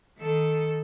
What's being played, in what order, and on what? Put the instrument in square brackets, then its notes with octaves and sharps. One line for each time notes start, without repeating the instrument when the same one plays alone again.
[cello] D#3 A4